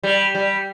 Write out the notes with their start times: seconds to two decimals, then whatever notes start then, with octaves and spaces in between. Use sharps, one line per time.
0.03 G3
0.35 G3